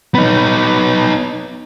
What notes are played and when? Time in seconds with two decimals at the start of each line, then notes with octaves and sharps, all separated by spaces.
0.15 B3 D#4